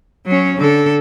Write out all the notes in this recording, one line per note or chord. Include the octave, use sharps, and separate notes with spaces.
F#3 C#4
D3 A4